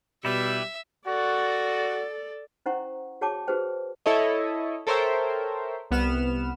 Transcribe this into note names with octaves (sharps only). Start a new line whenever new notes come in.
B2 G3 E4 G4 B4 E5
F#4 A4 D5
C#4 E4 C5 F#5 A#5 C#6
F#4 G#4 C#5 G5 A5 D6
F#4 G#4 B4 C5 G5
E4 A4 C#5 D#5
A4 A#4 C5 C#5 E5 G5
C2 B3 F6 E7